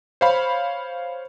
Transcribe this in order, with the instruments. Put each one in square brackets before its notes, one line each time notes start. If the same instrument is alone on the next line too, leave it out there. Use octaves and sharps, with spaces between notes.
[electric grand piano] C5 C#5 F5 B5